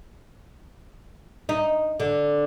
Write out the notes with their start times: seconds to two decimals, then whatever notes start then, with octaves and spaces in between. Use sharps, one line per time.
1.49 D#4
2.00 D3